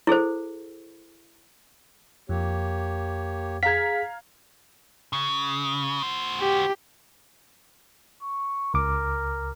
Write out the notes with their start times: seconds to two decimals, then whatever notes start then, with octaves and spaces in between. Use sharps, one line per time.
0.07 E4 G#4 A4 C5
2.29 F2 A#3 G4 C#5
3.63 G#4 F5 A#5 G#6 B6
5.13 C#3
6.03 F#4 C5
6.40 G4
8.22 C#6
8.74 C#2 A#4 D6